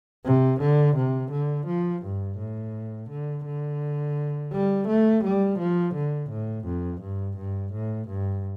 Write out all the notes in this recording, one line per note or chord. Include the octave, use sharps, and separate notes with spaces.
C3
D3
C3
D3
F3
G2
A2
D3
D3
G3
A3
G3
F3
D3
A2
F2
G2
G2
A2
G2